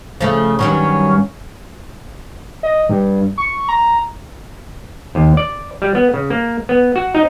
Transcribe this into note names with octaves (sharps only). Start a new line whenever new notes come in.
C#3 F3 A3
G2 D#3 F#3 C#4
D#5
G2
C#6
A#5
D#2
D5
G3
B3
C#3
A#3
B3
F#4
D#4